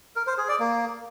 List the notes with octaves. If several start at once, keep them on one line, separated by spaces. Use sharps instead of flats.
A#4
C5
G#4
D5
A#3